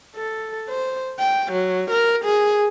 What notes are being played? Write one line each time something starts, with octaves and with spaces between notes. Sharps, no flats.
A4
C5
G5
F#3
A#4
G#4